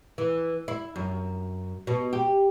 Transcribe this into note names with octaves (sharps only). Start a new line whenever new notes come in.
E3
E4
F#2
B2
G4